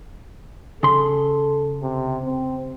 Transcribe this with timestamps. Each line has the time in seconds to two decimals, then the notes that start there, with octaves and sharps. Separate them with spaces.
0.83 C#3 A4 C6
1.82 C3
2.25 C4